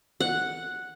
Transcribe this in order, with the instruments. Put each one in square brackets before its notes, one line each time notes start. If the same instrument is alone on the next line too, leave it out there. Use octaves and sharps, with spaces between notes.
[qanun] F#5